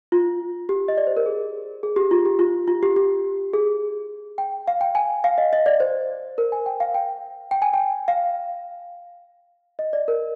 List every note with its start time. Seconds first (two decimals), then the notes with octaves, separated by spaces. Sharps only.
0.12 F4
0.69 G4
0.88 D#5
0.98 D5
1.07 C5
1.17 A#4
1.26 G#4
1.83 G#4
1.96 G4
2.11 F4
2.25 G4
2.39 F4
2.68 F4
2.83 G4
2.96 G4
3.53 G#4
4.38 G5
4.68 F5
4.81 G5
4.95 G#5
5.24 F5
5.38 D#5
5.53 D#5
5.66 D5
5.80 C5
6.38 A#4
6.52 G#5
6.66 G5
6.80 F5
6.95 G5
7.51 G5
7.62 G#5
7.74 G5
8.08 F5
9.79 D#5
9.93 D5
10.08 A#4